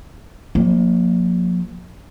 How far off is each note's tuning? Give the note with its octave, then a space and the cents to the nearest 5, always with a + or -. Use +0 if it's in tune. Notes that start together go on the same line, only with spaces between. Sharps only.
F3 +40 A#3 +0